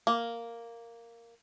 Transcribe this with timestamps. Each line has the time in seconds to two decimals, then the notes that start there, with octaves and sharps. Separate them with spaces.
0.07 A#3